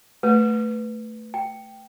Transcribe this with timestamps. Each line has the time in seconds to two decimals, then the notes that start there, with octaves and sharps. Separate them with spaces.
0.23 A3 B4
1.34 G5